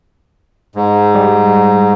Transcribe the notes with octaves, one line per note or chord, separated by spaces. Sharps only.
G#2
G3